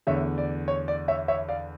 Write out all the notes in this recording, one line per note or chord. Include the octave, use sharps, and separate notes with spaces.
E2 D3 A3 C#5 E5
D5
C#5
D5
C#5 E5
C#5 E5
D5 F5